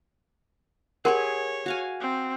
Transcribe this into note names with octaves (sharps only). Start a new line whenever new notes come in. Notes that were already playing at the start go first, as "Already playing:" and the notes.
G4 G#4 A#4 C#5 F#5 C6
F#4 F5 G#5
C4